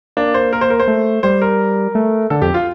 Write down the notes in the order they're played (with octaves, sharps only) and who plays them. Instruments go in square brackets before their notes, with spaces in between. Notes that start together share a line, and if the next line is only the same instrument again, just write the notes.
[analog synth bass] A#3 [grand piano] D4
[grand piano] C5
A#4
C5
A#4
C5
[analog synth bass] A3
[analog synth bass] G3 [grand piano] C5
[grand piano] A#4
[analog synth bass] A3
[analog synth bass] D3 [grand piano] A4
[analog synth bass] F2 [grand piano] G4
[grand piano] F4